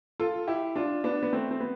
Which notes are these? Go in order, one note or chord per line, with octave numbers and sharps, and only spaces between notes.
F4 A4
E4 G4
D4 F4
B3 D4
B3
A3 C4
C4
B3